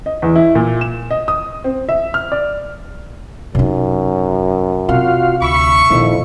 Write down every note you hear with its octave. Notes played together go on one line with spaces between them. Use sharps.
D#5
E2
E4
A#2
E7
D#5
D#6
C4
E5
F6
D5
F#2 C3 D#4
C3 F4 F#4 F5
D2 E5 B5 C#6
A#1 F2 A#2 D#3 E4